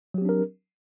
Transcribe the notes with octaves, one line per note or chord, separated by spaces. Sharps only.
F#3 C4 D4 G4 A#4